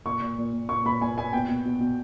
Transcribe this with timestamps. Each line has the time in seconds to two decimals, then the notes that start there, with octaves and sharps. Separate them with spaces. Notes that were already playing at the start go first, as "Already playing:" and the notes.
0.05 A#2 C#6
0.21 A#2
0.38 A#2
0.53 A#2
0.69 A#2 C#6
0.85 A#2 B5
1.01 A#2 G#5
1.18 A#2 G#5
1.33 B2 G5
1.48 B2
1.65 B2
1.80 B2